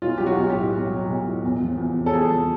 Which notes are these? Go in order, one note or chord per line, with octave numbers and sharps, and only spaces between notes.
B1 F4
F#3 G4
F#4
B1
G4
A2
B1
F#3
B1
A2
E2
F3
E2
C3
A4
E2 G#4
F3